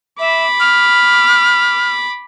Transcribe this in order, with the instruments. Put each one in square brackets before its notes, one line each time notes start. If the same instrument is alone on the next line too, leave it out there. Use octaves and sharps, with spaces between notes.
[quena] E5 [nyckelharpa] B5 D6
[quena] F6